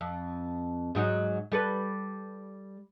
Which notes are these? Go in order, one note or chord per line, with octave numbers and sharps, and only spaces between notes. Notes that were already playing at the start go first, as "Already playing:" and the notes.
F2
G#2 F#3 D#4
G3 A4 B4